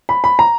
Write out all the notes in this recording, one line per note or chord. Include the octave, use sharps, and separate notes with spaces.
B5
B5
A#5